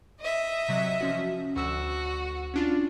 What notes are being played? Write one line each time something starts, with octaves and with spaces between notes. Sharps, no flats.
D#5 E5
C3 F#3
F3 C#4 F#4
D2 F#4 E6 E7
C#4 D4 F4